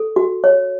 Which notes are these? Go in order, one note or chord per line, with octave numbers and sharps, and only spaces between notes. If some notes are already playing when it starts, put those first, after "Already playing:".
Already playing: A4
F#4
C#5